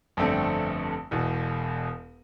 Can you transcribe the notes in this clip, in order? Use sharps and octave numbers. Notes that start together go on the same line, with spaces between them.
G1 F2 D3 A3 C4
E1 E2 B2